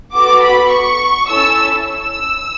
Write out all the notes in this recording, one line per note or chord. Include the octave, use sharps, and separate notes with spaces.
B3 F#4 A4 D6
B5
C#6
C#4 E4 A4 E6
E6